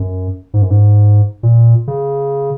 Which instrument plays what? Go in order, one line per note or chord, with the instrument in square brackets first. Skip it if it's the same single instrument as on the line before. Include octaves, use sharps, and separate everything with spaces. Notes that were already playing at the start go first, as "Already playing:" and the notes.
Already playing: [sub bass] F#2
G#2
F#2
G#2
A#2
C#3